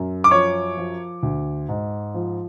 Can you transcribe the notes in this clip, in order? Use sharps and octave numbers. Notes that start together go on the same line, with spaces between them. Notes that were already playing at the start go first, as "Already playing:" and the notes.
Already playing: F#2
D6
F3 C#5 C#6
F3
D2
G#2
F3